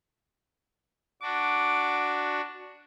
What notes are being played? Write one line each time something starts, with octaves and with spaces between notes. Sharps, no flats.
D4 F#4 D6